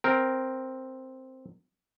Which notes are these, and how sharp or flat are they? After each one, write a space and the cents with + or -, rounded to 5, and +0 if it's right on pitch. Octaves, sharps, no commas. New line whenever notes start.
C4 +0 A#4 +0